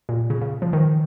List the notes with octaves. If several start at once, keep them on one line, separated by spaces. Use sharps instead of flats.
A#2
C#3
C#3
F3
D#3